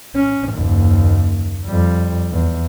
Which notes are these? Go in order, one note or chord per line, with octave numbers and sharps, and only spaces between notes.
C#4
F#1 D#2
F2 G3
E2